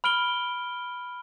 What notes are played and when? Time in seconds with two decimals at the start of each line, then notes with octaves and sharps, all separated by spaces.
0.04 B5 F6 D7 G7